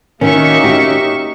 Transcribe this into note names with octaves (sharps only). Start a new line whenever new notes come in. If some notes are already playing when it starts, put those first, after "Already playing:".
D#3 A#3 C#4 D#4 F#4 E5 C#6
G4